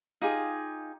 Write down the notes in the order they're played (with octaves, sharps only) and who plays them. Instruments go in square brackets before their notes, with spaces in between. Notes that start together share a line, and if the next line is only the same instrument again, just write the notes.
[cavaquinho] D#4 F4 G4 G#4